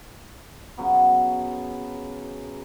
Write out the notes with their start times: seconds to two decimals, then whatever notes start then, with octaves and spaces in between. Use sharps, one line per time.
0.77 C#3 F#3 B3